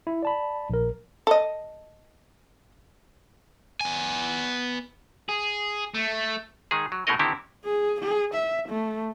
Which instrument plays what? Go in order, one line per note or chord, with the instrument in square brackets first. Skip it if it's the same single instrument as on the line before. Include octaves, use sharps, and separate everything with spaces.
[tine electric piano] E4
D5 A5 B5
A#1 A#4
[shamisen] A4 D#5
[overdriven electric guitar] B3 G#5
G#4
A3
[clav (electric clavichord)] D#3 G#3 G#4
F#3
B2 G#3 A3 D#4 A#4 D#5
D3 D#3 C4 E4 G4
[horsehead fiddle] G#4
G#4
E5
A3